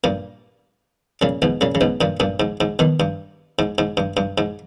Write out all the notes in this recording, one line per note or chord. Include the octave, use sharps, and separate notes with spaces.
G2 A#2
A#2 C#3
G#2 B2
A#2 C#3
C#3
G#2 B2
G2 A#2
G2 A#2
G#2
G#2
B2 D#3
G2
G#2
G#2
G2
G2
G#2